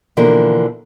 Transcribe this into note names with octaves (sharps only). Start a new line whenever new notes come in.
B2 D3 E3 F3 A#3 A#4